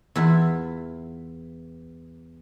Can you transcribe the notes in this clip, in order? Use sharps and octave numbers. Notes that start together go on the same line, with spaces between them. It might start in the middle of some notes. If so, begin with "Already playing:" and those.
E2 E4 F4